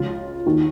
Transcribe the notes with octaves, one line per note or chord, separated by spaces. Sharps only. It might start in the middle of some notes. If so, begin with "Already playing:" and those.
Already playing: C#2 C#3 F3 F4
D#2 D#3